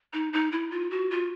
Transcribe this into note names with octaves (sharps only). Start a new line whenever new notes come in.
D#4
D#4
E4
F4
F#4
F4